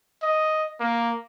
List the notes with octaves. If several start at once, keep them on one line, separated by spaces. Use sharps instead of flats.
D#5
A#3